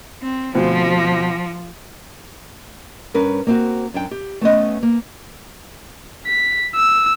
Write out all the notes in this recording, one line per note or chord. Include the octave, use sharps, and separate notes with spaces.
C4
D2 B2 F3 C4
G2 C#4 A#4 B4
A#3 C4 F#4
F#2 D4 G5
G4
A3 B3 C#4 D#5
A#3
B6
E6